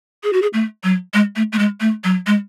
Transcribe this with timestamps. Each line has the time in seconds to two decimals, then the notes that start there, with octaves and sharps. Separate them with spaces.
0.23 G#4
0.33 F#4
0.42 G#4
0.53 A3
0.84 F#3
1.14 G#3
1.36 A3
1.53 A3
1.59 G#3
1.81 A3
2.04 F#3
2.27 G#3